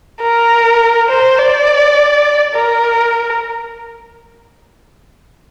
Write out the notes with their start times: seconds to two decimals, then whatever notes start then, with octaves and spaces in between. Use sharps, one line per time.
0.22 A#4
1.09 C5
1.39 D5
2.54 A#4